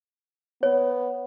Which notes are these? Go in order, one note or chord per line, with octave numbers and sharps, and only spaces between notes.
B3 C#5